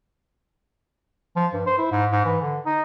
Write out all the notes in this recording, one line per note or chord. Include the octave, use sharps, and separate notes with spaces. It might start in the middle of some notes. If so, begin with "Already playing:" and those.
F3
G2
C5
E4
G#2
G#2
E3
D3
D#4